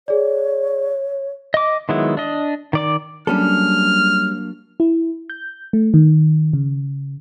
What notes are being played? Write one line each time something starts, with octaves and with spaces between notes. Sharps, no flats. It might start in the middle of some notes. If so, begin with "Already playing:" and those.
G#4 C#5 D5
D#5 D6
D#3 F#3 G#3 B3 E4
D4 D#5
D#3 D5 D6
F#3 G3 A#3 C#4 D4 A4 F6
E4
G6
A3
D#3
C#3